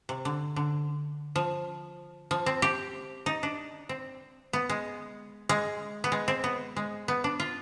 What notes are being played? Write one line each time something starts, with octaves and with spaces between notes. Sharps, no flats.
C3
D3
D3
F3
F3
C4
G4
D#4
D4
C4
B3
G#3
G#3
B3
G#3
C4
B3
G#3
B3
D4
F4